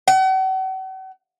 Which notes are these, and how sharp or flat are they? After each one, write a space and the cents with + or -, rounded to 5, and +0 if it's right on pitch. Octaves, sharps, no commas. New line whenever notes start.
F#5 +45